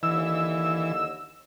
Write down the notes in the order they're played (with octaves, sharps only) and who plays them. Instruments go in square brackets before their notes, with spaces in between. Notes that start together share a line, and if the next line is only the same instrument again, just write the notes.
[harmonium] D#2 D3 D#5 [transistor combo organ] E3 [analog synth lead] E6